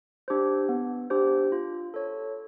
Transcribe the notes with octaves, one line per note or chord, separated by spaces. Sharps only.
D4 G4 C5
B3
D4 G4 C5
F4
A4 C#5